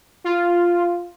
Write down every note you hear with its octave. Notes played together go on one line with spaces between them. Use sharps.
F4